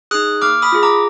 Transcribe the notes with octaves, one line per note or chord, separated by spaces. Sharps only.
D#4 G#4 D#6 F#6
A#3 D6 F6
B5 D#6
F4 G#4
A#5 D6